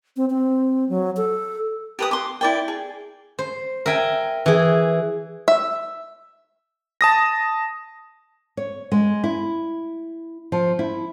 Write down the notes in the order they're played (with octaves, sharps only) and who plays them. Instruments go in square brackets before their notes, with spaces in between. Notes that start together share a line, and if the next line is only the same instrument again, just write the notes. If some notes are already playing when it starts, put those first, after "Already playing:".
[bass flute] C4
C4
F#3
A4
[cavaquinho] G4 B4 D#6
C6 D6
E4 D5 G5
G#4
[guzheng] C5
A#4 E5 G5 G#5
E3 G#4
[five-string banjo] E5
[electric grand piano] A5 D#6 A#6
[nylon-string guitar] C#5
G#3
E4
F3
E4